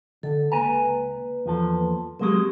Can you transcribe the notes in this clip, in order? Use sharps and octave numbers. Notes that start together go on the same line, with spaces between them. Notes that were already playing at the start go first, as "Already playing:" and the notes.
D3 A4
C#2 A#3 B4 G#5 A#5
E2 F3 A4
F#3 G#3 A#3 C4 G4